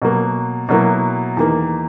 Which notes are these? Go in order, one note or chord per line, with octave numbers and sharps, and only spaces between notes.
B2 F#3 A#3
B2 F#3 A#3 E4
E2 D#3 A#3